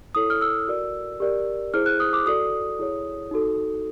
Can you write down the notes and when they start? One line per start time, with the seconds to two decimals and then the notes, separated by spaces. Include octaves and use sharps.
0.15 E4 A4 C#5 D#6
0.30 F6
0.42 E6
0.68 F#4 A#4 D5
1.20 G4 A#4 D5
1.74 E4 G#4 C5 F6
1.86 F#6
2.00 D#6
2.13 D6
2.26 F#4 A4 D5 D#6
2.79 E4 G#4 C#5
3.31 D#4 F#4 A4